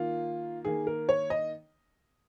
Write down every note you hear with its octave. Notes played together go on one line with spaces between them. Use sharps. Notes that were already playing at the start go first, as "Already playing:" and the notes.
Already playing: D#3 A#3 F4
D#3 A#3 G#4
A#4
C#5
D#5